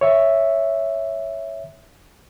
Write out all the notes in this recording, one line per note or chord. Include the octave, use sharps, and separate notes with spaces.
C#5 E5